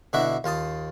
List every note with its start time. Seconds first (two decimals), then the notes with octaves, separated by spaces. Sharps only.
0.13 B2 D3 D4 E4 F#4 E5
0.44 D#2 F4 A5 D#6